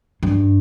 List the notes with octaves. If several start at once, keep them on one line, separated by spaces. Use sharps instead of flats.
G2